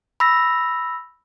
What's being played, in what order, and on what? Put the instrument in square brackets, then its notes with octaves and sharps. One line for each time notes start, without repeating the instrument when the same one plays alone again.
[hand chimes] B5 E6 A#6